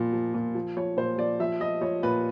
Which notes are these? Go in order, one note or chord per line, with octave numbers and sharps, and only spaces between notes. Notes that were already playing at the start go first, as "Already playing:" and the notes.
Already playing: A#2 F3
F3
A#2
F3
F3 C#5
A#2 C5
F3 D5
F3 E5
F3 D#5
F3 C#5
A#2 B4